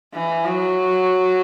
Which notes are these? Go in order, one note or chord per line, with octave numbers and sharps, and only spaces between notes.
E3
F#3